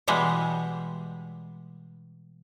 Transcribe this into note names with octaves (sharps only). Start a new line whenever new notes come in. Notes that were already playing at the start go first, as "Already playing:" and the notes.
B2 E3 G3 G#3 B3